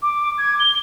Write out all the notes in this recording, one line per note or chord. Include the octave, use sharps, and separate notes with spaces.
D6
G#6
G7